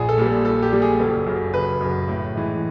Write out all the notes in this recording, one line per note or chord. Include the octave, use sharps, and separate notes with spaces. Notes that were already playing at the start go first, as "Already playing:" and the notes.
Already playing: A#1 G#4
A4
A#2 G3
A4
A#1 A4
G4
A#2 G3
G#4
F#1 A4
F#2 C#3
F#1 B4
F#2 C#3
A2
E3 G#3